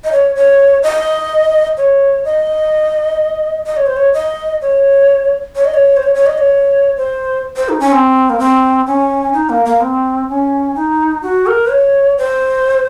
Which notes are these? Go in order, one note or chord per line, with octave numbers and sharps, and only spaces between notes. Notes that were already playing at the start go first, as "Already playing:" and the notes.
D#5
C#5
C#5
D#5
C#5
D#5
D#5
C#5
C5
C#5
D#5
C#5
C#5
D#5
C#5
C5
C#5
C#5
D#5
C#5
C5
C5
D#4
C#4
C4
A#3
C4
C#4
D#4
A#3
A#3
C4
C#4
D#4
F#4
A#4
C#5
C5